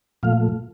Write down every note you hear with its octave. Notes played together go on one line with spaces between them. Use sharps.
A#2 F3 A3 F5